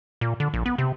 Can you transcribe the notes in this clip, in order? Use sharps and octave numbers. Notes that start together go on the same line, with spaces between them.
A#2
D3
A#1
B3
C3